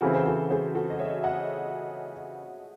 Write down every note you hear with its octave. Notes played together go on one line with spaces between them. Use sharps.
C#3 E3 C4 F#4 A4
C5
F#4 A4
G#4 C5
F#4 A4
D#5
C#5 E5
D#5 F#5